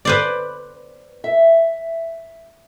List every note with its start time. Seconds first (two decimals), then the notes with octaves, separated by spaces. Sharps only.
0.05 B4 C5 D5
1.24 E5